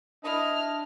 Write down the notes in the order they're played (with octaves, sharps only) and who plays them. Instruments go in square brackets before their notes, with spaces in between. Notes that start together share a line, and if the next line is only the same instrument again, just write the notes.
[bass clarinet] D4 [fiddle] E4 F6 [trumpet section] D#5